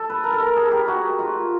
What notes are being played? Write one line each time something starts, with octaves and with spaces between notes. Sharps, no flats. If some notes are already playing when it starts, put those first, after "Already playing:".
Already playing: A4
B4
A#4
A4
A#4
G#4
G4
F#4
F4